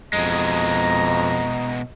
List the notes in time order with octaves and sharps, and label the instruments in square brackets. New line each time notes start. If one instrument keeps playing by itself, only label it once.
[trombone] F2 [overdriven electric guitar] B2 G#3 [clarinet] D#5 [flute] A#5